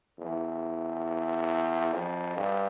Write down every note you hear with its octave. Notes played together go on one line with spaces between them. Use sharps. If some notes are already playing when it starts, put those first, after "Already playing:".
E2
F2
G2